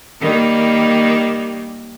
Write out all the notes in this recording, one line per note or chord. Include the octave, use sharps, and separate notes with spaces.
D#3 G3 A#3